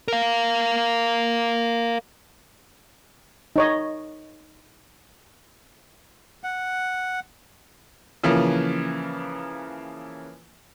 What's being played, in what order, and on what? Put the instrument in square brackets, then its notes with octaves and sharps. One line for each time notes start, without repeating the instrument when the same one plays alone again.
[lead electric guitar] A#4 F5
[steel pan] D#4 C#5 D#5
[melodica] F#5
[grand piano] C#3 E3 F3 A#3